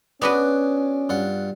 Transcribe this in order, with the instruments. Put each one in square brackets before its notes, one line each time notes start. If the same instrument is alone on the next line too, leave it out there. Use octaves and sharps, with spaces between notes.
[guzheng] B3 F#4 B4 [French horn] C#4 [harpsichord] D4 G#4 D6
[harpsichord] G2 F4 F#5